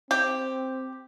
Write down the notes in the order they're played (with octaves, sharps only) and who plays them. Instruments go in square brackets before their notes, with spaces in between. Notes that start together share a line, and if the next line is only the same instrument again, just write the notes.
[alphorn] C4 [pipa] G4